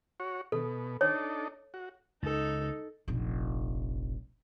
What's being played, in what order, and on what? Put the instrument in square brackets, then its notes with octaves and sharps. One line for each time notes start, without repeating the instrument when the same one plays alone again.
[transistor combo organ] F#4 C#5
[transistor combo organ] B2 [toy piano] A4
[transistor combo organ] D4 D#4 A4 [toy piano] C#5
[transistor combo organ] F#4
[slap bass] C#2 [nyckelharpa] D#4 A4
[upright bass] F1 A#1